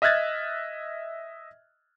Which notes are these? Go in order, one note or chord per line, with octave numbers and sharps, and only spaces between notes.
D#5 E5 F6 F#6 G#6 A6